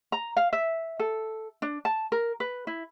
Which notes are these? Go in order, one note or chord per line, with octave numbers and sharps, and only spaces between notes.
A#5
F5
E5
A4
D4
A5
A#4
B4
E4